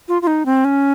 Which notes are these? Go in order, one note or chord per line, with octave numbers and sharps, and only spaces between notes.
F4
F4
D#4
C4
C#4